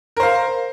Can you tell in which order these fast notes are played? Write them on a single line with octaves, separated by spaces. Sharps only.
A#4 C5 F5